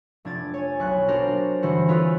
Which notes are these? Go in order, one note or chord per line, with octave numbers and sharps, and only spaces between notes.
F1 D4 G#6 A6
C#5 G#5
B1 C#6 F#6
D4 F#4 A#4 C5
G1 E3 F#4 C5 C#7
C4 F4 G#4 A4 B4 C#5